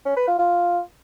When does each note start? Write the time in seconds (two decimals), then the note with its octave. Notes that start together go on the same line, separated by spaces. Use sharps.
0.05 C#4
0.17 B4
0.28 F4
0.39 F4